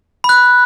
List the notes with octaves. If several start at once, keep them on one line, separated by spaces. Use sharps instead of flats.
B5 F#6